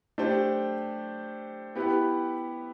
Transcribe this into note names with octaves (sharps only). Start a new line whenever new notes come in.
A3 D4 G4 C5
B3 E4 G4 B4